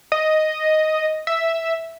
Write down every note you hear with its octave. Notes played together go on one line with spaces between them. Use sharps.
D#5
E5